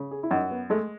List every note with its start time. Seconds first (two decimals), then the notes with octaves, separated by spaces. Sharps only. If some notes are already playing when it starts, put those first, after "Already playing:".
Already playing: C#3
0.11 G#4
0.23 E4
0.31 F#2 D#4
0.50 B3
0.70 G#3 A3